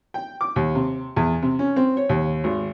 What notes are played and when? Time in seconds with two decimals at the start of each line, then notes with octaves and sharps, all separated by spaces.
0.14 G5
0.41 D6
0.56 D#2
0.75 C3
1.16 E2
1.42 C3
1.59 C#4
1.76 C4
1.97 C#5
2.09 D#2
2.44 G#1